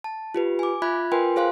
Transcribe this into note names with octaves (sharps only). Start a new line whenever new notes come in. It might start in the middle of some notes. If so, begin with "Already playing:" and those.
A5
F4 G4 B4
G#5 D6
F4 E5 B5 F#6 G#6
F4 A#4 B4 G5 G#5 C6
G#4 C5 F5 C6 F#6